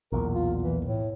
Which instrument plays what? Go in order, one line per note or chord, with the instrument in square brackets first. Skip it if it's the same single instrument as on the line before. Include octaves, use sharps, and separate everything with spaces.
[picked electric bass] B1 E2 A#2 [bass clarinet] A#4
[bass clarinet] F4
E3
A2